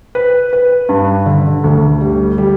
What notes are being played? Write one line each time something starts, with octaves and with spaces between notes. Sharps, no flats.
B4
B4
G2
D3
D2
G3
G3